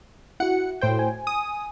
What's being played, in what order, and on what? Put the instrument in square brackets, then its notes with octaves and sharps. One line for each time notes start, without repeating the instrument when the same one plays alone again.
[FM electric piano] E4 F#4 [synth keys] F#5 C#7
[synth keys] A2 C5 G5
[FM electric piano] G#5
[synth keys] D#6